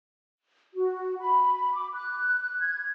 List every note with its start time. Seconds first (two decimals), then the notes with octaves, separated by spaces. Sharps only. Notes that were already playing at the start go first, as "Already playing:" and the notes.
0.74 F#4
1.20 B5
1.74 D6
1.94 F#6
2.59 G#6